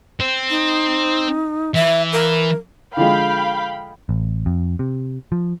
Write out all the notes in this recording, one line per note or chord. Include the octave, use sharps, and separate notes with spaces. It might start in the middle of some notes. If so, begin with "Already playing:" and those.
C4
D#4
E3 E5
A#4
D3 F3 G#3 F5 G5 B5
A1
F2
C3
F3